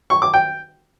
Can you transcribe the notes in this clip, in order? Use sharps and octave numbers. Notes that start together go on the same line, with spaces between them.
C#6
D6
G5